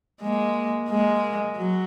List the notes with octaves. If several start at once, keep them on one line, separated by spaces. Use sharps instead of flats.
G#3 A#3
G#3 A#3
F#3